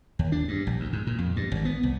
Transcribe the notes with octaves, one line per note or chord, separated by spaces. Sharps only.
D#2
D4
G2
A#1
D2
G#2
A#2
F2
G2
G#1
B3
C2